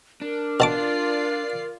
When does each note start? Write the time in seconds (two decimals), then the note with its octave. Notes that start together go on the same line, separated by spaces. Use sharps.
0.22 D4 A#4
0.60 B2 F4 D5 A5 D6 C7